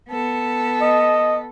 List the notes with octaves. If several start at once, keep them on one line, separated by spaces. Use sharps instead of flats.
B3 A4
D#5